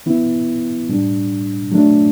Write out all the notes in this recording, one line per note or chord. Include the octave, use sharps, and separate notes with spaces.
E3 B3 E4
A2 G3 D4
F#3 A3 D4